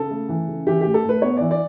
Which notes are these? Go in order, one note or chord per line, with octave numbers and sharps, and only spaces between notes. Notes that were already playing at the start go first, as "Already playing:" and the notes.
Already playing: C#3 A4
A3
E3
C#3
E3 G4
A2 G4
A4
A2 B4
B3 C#5
E3 D5
D5